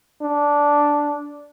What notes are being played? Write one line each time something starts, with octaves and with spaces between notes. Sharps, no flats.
D4